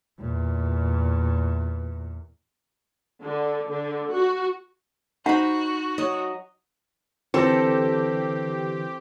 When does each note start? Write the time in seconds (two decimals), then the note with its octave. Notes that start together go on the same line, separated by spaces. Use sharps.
0.19 E2 A#2
3.24 D3
3.70 D3
4.12 F#4
5.26 D#4 F#4 C5 F#5 B5
5.98 F#3 D#5
7.34 D3 E3 C4 G4 A4 A#6